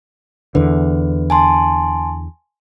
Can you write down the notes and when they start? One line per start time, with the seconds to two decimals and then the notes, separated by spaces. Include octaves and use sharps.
0.55 E2 D3 B4
1.30 G#5 A5 C6